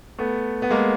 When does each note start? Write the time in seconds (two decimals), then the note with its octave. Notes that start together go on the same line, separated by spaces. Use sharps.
0.18 A3 B3
0.62 B3
0.70 G#3 A#3